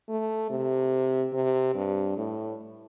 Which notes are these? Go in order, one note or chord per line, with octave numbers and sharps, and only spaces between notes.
A3
C3
C3
G2
A2